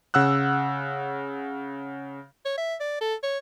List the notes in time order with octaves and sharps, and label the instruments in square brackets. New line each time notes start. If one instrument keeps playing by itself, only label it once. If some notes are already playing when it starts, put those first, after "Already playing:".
[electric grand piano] C#3 F#5 E6 F#6
[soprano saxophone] C#5
E5
D5
A4
C#5